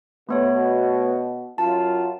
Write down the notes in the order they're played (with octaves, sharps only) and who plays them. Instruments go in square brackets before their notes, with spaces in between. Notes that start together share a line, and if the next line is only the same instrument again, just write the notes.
[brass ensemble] B2 [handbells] A3 B3 C#5
[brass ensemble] F#2 F4 [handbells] A5